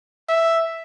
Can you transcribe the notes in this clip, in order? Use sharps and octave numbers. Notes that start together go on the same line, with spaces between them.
E5